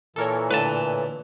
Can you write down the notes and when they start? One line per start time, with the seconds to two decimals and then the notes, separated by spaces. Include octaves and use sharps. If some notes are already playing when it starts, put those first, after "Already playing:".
0.16 A#2 E3 A4 A#4 C#5
0.51 A2 D3 F4 B4 A5